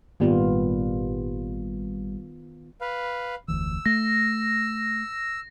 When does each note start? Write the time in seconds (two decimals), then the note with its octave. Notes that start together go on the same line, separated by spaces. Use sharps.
0.20 G#1 A#2 D#3 G3 B3 F4
2.81 B4 F5
3.48 F1 D2 E3 E6
3.86 A3 A#6